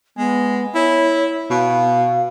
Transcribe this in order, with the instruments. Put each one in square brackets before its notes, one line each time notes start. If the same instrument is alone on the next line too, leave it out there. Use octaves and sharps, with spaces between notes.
[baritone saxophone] G#3 [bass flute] B3
[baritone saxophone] E4 [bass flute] C#5
[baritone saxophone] B2 [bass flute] F5